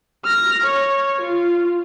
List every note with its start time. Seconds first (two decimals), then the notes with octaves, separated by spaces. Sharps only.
0.24 F6 A#6
0.63 C#5
1.21 F4